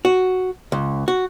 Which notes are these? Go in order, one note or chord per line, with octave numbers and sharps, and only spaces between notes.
F#4
C#2
F#4